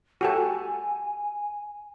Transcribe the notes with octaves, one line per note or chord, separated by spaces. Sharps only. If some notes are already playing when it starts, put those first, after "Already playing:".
F#4 G4 A4 G#5